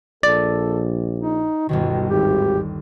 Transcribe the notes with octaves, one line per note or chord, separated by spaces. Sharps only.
A#1 A4 D5
D#4
G1 D#2 B2 D#3
G#1 G4